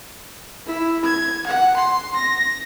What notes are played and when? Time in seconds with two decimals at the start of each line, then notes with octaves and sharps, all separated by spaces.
0.67 E4
1.05 G#6
1.46 F#5
1.77 C6
2.16 A#6